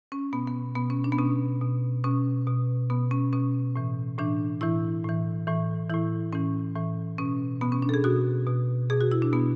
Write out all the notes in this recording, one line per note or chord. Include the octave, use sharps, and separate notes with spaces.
C#4
B2 B3
B3
B2 B3
C#4
D4
B3
B2 C#4
B2
B2 C#4
B2
B2 B3
C#4
B2 C#4
A2 E3
A2 E3 D4
A2 E3 E4
A2 E3
A2 E3
A2 E3 E4
A2 E3 C#4
A2 E3
B2 C#4
B2 B3
C#4
D4
A4
G#4
B2 F#4
B2
B2 G#4
F#4
E4
D4
B2 B3